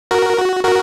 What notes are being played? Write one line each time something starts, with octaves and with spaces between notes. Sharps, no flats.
F#4 A#4
F#4
F#4 A#4